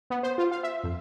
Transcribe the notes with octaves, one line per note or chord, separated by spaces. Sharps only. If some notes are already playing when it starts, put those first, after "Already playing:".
B3
C5
F4
F5
E5
F2